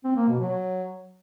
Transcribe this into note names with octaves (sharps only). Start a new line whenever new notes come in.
C4
A#3
B2
F#3